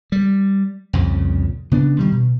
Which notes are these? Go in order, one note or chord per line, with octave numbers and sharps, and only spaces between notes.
G3
C2 F2 A#2 C#3
C#3 B3 D4
D#3 F3 G3
B2